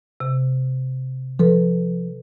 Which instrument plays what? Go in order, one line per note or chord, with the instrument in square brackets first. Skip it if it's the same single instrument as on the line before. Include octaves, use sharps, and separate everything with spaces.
[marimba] C3
[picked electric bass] F3 [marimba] A4 B4